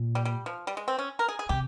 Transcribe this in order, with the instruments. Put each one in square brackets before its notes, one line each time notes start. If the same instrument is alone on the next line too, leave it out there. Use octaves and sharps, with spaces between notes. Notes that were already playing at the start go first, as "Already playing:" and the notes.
Already playing: [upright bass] A#2
[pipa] G3
G3
F3
G3
G#3
C4
C#4
A#4
G#4
G#4
[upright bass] C3 [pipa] G4